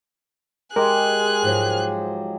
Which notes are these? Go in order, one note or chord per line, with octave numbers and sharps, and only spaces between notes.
G#3 G4 G#4 A#4 F#6
G#2 F3 F#3